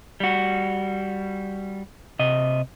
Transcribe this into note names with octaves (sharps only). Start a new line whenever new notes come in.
G3 F#4
C3 D#5